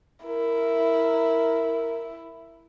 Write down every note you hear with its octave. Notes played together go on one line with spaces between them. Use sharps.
E4 A#4